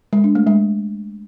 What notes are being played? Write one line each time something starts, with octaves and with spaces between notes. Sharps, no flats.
G#3
D4
A3
G#3